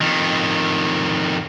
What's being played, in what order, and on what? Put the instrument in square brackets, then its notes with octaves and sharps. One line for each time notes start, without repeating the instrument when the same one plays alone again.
[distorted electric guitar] F2 D#3